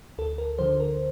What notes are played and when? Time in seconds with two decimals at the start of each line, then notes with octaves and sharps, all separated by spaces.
0.18 D2 A4
0.38 A#4
0.59 D3 F3 C5
0.80 A#4